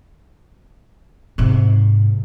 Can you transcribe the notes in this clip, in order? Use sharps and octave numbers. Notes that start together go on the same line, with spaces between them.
G#2 C3